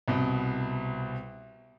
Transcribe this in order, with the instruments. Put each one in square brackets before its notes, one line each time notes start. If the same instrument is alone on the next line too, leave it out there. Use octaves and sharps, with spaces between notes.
[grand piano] C2 B2